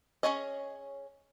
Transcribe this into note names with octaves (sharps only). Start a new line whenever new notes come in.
C#4 D#4 G#4 C#5 D#5